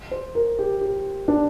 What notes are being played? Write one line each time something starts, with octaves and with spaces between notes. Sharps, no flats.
C5
A#4
G4
G4
D4